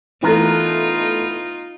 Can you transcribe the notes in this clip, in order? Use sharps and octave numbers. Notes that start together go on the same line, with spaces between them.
E3 A3 B3 D#4 F4 A#4 A#5